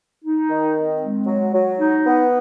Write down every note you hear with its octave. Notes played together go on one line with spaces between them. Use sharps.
D#4
D#3
C4
G#3
F#3
F#3
D#4
B3